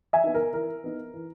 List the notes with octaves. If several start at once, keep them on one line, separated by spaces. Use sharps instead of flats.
E5 G#5
B3 D#4
A#4
E3 A#4
B3 D#4
E3